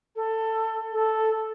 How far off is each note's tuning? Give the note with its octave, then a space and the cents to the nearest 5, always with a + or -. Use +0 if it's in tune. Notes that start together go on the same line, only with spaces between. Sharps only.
A4 +15
A4 +0